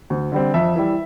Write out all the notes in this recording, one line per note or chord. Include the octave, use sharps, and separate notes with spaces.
D2
D3 G3 C4
F2 E5
E3 G3